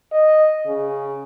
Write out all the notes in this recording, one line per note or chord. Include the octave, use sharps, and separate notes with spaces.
D#5
C#3